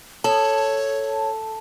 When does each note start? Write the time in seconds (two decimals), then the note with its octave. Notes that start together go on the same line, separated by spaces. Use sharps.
0.24 A4 C#5 A5